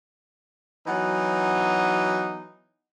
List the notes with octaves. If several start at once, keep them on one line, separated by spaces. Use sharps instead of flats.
E3 F#3 B3 D#4